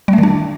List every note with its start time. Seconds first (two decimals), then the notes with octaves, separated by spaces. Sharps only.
0.08 G3
0.13 A3
0.18 D#3
0.23 D4